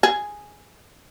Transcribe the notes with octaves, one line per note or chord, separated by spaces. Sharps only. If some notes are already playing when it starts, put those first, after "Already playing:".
G#4